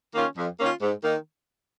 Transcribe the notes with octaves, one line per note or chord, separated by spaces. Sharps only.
D#3 A#3 C#4 F4
F2
D#3 A#3 C#4 F4
G#2
D#3 A#3 D#4